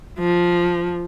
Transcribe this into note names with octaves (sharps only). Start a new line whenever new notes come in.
F3